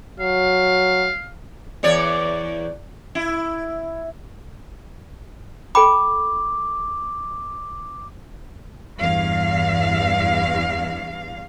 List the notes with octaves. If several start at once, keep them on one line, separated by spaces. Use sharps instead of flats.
F#3 F5
E2 C#5 D5
E4
A4 G5 B5 D6
E2 G2 F5